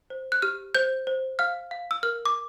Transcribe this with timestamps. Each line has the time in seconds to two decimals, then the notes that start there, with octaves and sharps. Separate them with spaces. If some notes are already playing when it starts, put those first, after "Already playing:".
0.10 C5
0.32 F#6
0.42 G4 F6
0.75 C5 G6
1.07 C5
1.39 F5 F6
1.71 F5
1.91 E6
2.03 A#4 F6
2.26 D6